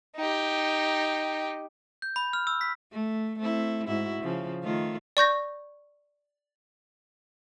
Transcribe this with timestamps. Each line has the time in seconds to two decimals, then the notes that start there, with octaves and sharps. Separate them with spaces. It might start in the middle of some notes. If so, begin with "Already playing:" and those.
0.16 D#4 G4
2.02 G6
2.16 B5
2.33 F6
2.47 E6
2.61 B6
2.92 A3
3.39 A3 C4 E4
3.87 G#2 E4 F#4
4.23 C#3 F3
4.63 D#3 A3 F4
5.17 D5 C#6 G6 A#6